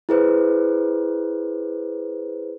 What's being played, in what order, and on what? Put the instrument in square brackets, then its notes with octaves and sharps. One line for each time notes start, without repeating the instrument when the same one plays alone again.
[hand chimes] E4 G#4 B4 C5